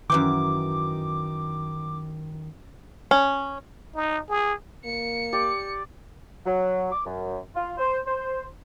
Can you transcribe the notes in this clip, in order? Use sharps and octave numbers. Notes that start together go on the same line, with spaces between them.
F#2 D#3 E3 G5 D6
C#4
D#4
G#4
A#3 C#7
G4 D5
F#3
D6
F#2
F4
C5
C5